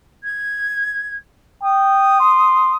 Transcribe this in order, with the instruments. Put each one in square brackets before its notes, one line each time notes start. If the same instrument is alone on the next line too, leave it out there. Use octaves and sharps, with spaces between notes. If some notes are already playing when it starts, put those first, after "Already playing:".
[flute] G#6
[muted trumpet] G5 [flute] D#6
[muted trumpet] C6